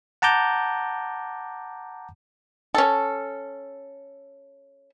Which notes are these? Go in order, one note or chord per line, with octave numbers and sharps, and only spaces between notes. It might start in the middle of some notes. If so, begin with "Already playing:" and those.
F#5 A5 A#5 D6 G6
C#4 A4